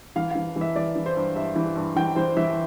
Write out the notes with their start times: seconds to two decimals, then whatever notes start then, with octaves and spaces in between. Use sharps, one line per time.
0.16 E3 F5
0.31 E3 F5
0.56 E3
0.61 E5
0.76 E3 D5
0.96 E3
1.06 C5
1.16 G2
1.35 G2 E5
1.56 E3
1.76 G2
1.96 E3 G5
2.16 E3 C5
2.37 E3 E5